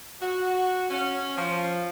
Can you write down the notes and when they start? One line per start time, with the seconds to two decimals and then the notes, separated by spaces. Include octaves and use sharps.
0.21 F#4
0.90 C#4
1.38 F3